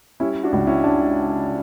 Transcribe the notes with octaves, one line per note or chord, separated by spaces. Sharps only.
G3 C#4 E4
D4 F#4
C#2
C#4 E4
D4